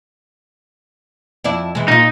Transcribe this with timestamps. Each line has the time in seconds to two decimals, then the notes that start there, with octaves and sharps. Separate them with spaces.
1.44 F2 E4 D5
1.75 E3 G#3
1.88 A#2 D#4 F4